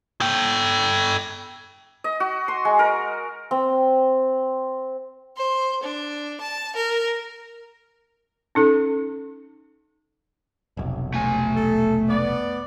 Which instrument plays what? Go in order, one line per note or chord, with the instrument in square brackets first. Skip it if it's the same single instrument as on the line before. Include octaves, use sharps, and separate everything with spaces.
[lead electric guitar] A4 G5
[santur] D#5
F#4
C6
G#3
A#4
C4
[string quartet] C5
D4
A5
A#4
[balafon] C#4 D#4 A4
[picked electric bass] F1 B1
[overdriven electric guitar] A3 G#5
[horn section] A4
B3 D5